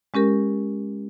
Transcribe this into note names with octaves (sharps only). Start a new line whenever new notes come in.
G#3 C#4 G4 A#4